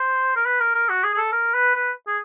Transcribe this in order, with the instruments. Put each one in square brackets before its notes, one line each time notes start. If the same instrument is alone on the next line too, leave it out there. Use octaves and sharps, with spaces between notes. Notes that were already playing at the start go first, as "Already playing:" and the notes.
Already playing: [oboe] C5
A#4
B4
A#4
A#4
F#4
G#4
G#4
A4
A#4
B4
B4
G#4